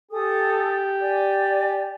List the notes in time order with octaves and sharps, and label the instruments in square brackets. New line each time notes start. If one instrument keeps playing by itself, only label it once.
[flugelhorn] G4 [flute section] A4 G#5 D#6
[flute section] D5 G#5